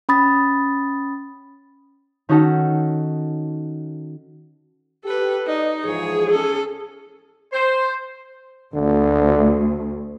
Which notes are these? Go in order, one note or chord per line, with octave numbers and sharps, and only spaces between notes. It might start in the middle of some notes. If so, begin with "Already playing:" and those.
C#4 B5 D#6 A6
D#3 C#4 D#4 F#4 A4
G4 A4 B4
D#4 B4 D5 D#5
G#2 E3 F3 G#4 C#5
C#4 A4
C5
D2 D3